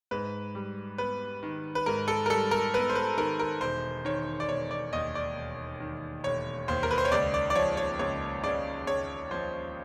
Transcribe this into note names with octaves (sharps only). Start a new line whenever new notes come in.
G#2 B4
G3
B3 B4
D#3
B4
G#2 A#4
A4
A#4
G3 A4
A#4
B3 B4
C5
B4
D#3 A#4
A#4
E1 C5
D#3 C#5
D5
E1 C#5
D5
D#2 D#5
D5
E1
D#3
E1 C#5
D#2 C5
A#4
B4
C5
C#5
C#2 D5
D5
D5
F3 C#5
C#5
C#2 C#5
C#3 D5
C#2 C#5
F3 C5